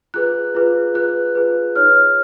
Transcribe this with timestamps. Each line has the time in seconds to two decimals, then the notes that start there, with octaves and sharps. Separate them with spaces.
0.14 F4 G#4 B4 F#6
0.55 F4 G#4 B4
0.94 F4 G#4 B4 F#6
1.35 F4 G#4 B4
1.75 D#4 G#4 C#5 F6